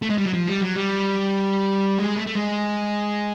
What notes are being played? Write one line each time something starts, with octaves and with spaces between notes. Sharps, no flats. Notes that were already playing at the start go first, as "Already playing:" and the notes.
A3
G#3
G3
F#3
F3
G3
F#3
G3
G#3
A3
A3
G#3